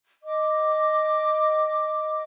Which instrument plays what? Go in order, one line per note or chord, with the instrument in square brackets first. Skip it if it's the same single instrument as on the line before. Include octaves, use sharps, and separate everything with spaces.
[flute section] D#5 D6